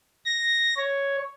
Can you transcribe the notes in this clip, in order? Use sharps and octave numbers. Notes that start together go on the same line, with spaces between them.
A#6
C#5